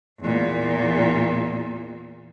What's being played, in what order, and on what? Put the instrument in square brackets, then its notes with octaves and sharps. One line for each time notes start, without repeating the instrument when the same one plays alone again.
[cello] E2 A#2